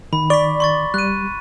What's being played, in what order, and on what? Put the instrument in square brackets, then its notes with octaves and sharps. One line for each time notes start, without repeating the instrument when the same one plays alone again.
[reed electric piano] D#3 [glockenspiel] B5
[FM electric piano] D5 [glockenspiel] C#6 B6
[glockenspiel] C6 C#6 A6
[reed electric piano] G3 [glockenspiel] F#6 D#7